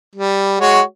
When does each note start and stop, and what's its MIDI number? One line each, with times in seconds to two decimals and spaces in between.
0.15 0.57 55
0.60 0.81 56
0.60 0.81 66
0.60 0.81 73